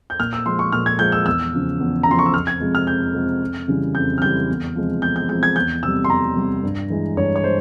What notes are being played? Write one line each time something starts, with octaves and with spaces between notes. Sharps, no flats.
G6
A#2 F6
E6
F3 G#3 C6
C#6
A#2 F6
G#6
F3 G#3 G6
E6
E2 E6
C#3 F3
E2
A#5
C#3 F3 C6
C#6
E6
F2 F6
G#6
C3 F3 G#3
F6
F2 G6
C3 F3 G#3
F2
C#3 E3 G3
F2 G6
F6
C#3 E3 G3 G6
E2
C3 F3 G#3
E2 G6
G6
C3 F3 G#3 G6
G#6
E2 G6
C3 G3 E6
C6
E2 A#5
C3 G3
G2
E3 G#3
G2 C#5
C#5
G#3 C5